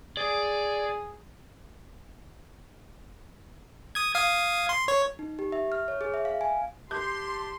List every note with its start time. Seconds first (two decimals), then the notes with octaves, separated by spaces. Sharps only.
0.17 G#4 D5
3.95 D#6 G#6
4.15 F5 D#6 G#6
4.69 C6
4.88 C#5
5.19 D#4
5.39 G4
5.52 E5
5.72 F6
5.88 C#5
6.01 G#4
6.14 E5
6.25 F5
6.41 G#5
6.91 G4 A5 C6 G6